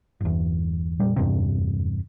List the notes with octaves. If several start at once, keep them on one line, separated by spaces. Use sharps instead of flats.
G1 E2
F1 A#2 G3
F1 E2 G2 C3